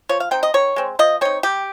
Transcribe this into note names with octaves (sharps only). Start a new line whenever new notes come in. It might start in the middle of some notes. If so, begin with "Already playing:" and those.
F3 C#5
F5
C4 D#4 G5
D#5
D#3 C#5
G#3 C4
F3 D#5
C4 D#4 C#5
G3 G4